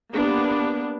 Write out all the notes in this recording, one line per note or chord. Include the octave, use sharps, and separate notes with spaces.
A#3 B3 D4 G4